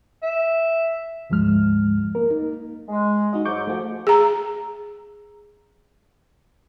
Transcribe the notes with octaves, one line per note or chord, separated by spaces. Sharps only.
E5
D2 G#2 F3 G#3 F6
A#3 A#4
D#4
G#3
D#4 F#4 D#5
G#2 F#3 C#6 D6 G6
F3 A3 F#4
G#4 A#5